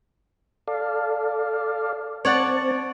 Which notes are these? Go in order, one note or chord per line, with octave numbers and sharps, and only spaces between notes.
A4 D5 F5
C4 C#5 D5 F#5 A5